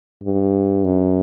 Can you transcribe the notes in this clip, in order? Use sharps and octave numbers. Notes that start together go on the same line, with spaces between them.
G2
F#2